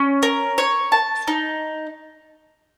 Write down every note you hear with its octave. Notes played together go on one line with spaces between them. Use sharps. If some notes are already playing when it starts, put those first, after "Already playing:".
Already playing: C#4
A#4
C#5
A5
D#4